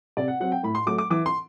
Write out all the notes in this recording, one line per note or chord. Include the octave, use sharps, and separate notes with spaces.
C3 D5
F#5
F#3 C4 F#5
G5
A2 B5
C6
F#3 A3 D6
D6
E3 D6
C6